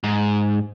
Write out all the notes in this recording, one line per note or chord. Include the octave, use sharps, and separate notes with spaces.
G#2